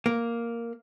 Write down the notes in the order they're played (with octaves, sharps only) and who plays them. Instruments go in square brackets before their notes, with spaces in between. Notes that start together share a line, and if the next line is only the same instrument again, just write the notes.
[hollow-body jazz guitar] A#3